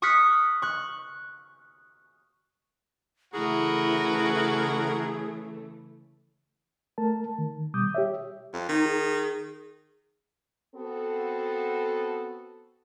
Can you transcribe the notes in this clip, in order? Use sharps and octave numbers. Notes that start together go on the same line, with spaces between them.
C#6 D#6 F6 F#6 B6 C#7
C#6 F#6
C#3 E3 A3 E4 F#4 G#4 A#4 B4
A3 A#4 A5
D#3
B2 G3 D6 D#6 G6
G4 C#5 E5
F2
D#3 D#4
G#4
B3 C4 F#4 A4